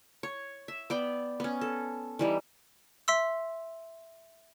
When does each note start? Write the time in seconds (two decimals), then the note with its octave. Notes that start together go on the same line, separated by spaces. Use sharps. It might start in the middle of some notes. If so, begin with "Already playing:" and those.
0.23 C#5
0.68 E5
0.90 B3 D5 G5
1.40 B3 C#4
1.61 A4
2.19 E3 G3 D#4
3.08 E5 C6 E6